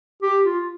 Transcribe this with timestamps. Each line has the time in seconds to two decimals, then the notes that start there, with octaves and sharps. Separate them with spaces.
0.23 G4
0.44 F4